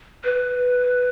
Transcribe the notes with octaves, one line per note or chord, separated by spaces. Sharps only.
B4